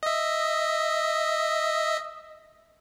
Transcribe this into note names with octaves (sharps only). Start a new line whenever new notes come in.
D#5 E5